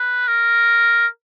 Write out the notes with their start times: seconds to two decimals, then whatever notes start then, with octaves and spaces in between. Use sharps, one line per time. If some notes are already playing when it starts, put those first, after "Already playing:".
Already playing: B4
0.28 A#4